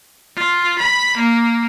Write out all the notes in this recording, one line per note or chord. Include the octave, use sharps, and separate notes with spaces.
F4
B5
A#3